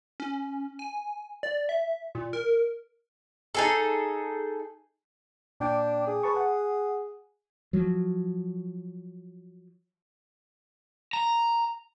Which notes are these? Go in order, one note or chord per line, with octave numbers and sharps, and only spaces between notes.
C#4
G#5
D5
E5
A#2
A#4
D#4 G#4 A4
A#2 D4 G5 D6
G#4
B4 A5 C#6
F#5
F3 F#3
A#5